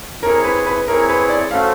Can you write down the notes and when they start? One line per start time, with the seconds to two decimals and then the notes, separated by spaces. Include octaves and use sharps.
0.23 C4 E4 G#4 A#4 C#5
0.44 B4
0.66 B4
0.87 C4 E4 G#4 A#4 C#5
1.09 B4
1.29 D5
1.51 A3 C#4 F#4 A4 C5 F5